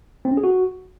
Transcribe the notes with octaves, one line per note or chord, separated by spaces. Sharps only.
C4
C#4
G#4
F#4